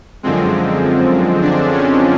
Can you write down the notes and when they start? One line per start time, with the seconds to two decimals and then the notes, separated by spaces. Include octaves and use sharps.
0.23 F#2 D3 F3 G#3 C4
1.42 D4
1.72 C#4